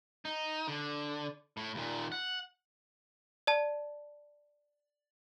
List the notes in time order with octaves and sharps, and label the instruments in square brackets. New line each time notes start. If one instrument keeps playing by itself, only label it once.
[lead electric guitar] D#4
D3
A2
D#2 A#2
F#5
[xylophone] D5 A5